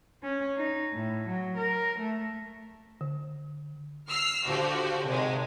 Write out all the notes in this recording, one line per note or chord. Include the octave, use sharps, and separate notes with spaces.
C#4
D#4
A2
F#3
A#4
A3
D3
E6 F6 C7
D3 F3 F#4 G4
G#1 C3 G#3